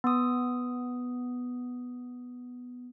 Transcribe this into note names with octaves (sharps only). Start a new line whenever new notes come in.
B3 D#6